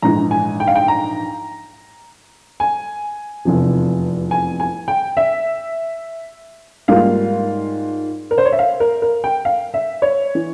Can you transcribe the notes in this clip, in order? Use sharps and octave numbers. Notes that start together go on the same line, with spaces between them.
A#1 G#2 E3 A#5
G#5
G5
F5
G5
A#5
G#5
F1 E2 C3 F3
G#5
G#5
G5
E5
G#2 G3 A#3 F4 F5
A#4
C5
C#5
E5
F5
A#4
A#4
G5
F5
E5
C#5
E3